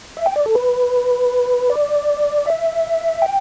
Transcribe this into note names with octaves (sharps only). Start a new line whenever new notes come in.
E5
G5
D5
A4
B4
D5
E5
G5